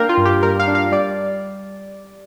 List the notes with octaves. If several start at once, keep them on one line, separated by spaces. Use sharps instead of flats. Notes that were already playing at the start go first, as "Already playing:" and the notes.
Already playing: G3 A#3 D4 A#4 F5 G5
F4
G2
G4
G3 A#4
F5
D4
F5
G3 D5